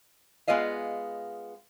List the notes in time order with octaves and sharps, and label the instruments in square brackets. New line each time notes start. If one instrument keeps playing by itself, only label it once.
[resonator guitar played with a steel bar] G#3 B3 F4 D#5 F5